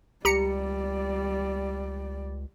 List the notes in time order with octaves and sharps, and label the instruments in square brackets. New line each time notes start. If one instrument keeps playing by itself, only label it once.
[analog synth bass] C#2 [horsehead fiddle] G3 D5 [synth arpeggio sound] G4 A#5 C#7